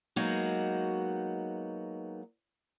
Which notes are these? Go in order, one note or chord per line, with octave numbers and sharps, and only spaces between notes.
F#3 G#3 A#3 B3 D#4 F#4